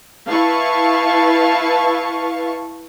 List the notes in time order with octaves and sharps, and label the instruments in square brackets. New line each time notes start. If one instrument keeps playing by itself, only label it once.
[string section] E4 B4 F5 A5 C#6